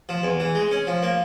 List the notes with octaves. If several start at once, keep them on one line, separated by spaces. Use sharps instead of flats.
F3
E2
E3
G#3
C#4
F3
A#3